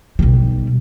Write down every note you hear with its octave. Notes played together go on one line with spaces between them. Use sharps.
B1 G3